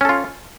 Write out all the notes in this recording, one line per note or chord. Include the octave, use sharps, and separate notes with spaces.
C#4 F4 A4